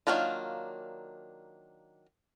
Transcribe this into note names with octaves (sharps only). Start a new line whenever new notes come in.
D#3 F#3 A#3 D4 F4